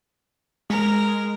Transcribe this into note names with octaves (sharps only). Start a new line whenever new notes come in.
G#3 A#4